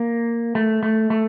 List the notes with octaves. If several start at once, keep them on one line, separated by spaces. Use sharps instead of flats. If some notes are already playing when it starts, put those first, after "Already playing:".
Already playing: A#3
A3
A3
A3